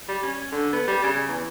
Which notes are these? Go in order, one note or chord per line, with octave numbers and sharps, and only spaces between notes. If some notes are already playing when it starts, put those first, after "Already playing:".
G3
C#4
D3
B3
G3
C#3
E2